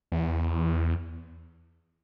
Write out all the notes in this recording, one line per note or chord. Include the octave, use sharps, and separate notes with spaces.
E2